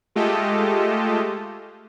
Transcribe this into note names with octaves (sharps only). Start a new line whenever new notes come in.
G#3 A3 F4 G4 A4 D#5